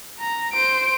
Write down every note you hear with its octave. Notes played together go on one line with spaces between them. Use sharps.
A#5
C5 D7